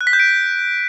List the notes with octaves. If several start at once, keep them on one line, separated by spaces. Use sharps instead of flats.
F#6
B6
G6
D7